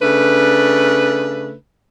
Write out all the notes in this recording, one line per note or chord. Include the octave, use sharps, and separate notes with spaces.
C#3 A3 D4 B4